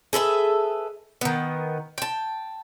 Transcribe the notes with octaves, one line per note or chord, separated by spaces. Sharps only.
G#4 A4 B4 E5
D#3 B3
G5 A5